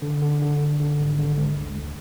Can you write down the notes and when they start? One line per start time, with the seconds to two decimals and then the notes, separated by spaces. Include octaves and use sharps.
0.02 D3
0.22 D3
0.41 D3
0.60 G#1
0.80 D3
0.99 G#1
1.18 D3
1.37 G#3
1.57 D2
1.76 D2